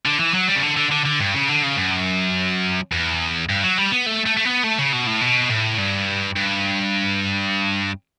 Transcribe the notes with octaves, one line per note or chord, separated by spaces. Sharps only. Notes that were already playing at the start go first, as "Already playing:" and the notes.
D3
E3
F#3
G3
C#3
D3
D3
D3
D3
G2
C#3
D3
C#3
F#2
E2
G2
F#3
G3
B3
A3
A3
A3
B3
A3
C#3
B2
A2
B2
A2
G2
G2